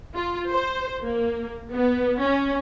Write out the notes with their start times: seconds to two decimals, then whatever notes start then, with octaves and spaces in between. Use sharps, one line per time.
0.15 F4
0.50 C5
1.04 A#3
1.73 B3
2.21 C#4